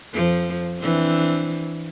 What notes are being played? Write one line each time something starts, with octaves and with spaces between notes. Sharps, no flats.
F2 F3
E3 C4 D4